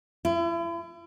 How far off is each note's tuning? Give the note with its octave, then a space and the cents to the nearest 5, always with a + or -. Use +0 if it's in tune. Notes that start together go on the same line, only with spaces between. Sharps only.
E4 +40